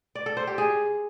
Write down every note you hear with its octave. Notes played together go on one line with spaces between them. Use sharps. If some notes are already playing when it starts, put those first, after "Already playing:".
D5
A4
C5
G4
G#4